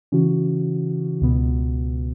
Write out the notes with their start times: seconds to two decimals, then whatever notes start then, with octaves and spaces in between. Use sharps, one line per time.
0.12 C#3 E3 C#4 F#4
1.21 C#2 B2 B3